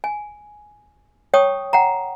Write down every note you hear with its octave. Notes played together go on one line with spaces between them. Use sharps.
G#5
C#5 G5 A5 C#6 D#6
F#5 G5 A#5